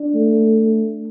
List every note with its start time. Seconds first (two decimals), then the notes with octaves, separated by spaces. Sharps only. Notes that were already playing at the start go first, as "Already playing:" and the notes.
Already playing: D4
0.14 A3